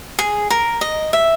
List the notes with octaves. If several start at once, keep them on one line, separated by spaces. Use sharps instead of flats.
G#4
A#4
D#5
E5